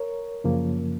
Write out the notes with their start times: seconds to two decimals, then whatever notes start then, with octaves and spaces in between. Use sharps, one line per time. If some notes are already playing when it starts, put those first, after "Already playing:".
Already playing: A#4 C#5
0.44 F#2 C#3 F3 A#3